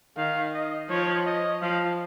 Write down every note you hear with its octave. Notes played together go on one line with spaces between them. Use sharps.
D#3 F5
D#5
F3 C#5
D#5
F3 F5